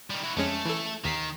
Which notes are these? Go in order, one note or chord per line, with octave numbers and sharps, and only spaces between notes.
D#3 G3
E4 F#4
F2 G#3 A3 C#4
E3 A4
D#2 D#3 B6 C7